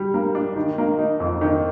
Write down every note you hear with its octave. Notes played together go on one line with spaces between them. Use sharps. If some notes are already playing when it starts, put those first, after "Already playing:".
Already playing: G3
A#3
D4
D#3
A#3
D#4
F2
D#3